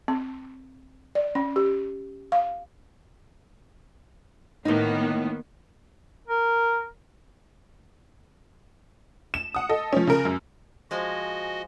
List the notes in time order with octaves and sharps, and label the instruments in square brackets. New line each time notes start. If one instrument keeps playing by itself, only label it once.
[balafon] C4
D5
C#4
G4
F5
[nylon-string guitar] A2 D#4 [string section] D#3 A#3 B3
[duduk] A#4
[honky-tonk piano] E7
F#5 D#6
A4 D#5
F3 C#4
C#3 A#4
F#2
[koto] F3 G#3 G#5 [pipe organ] F#4 D#5